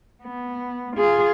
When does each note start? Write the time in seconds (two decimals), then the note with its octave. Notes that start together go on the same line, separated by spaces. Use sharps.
0.23 B3
0.97 F4 G#4